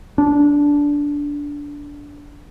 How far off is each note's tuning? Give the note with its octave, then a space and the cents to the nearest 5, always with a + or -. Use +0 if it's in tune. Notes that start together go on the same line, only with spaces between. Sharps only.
D4 -15